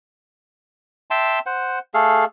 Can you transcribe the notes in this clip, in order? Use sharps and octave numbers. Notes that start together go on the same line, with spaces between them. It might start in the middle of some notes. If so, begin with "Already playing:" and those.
E5 G5 A5 C6
C5 F#5
A3 G#4 A4 F5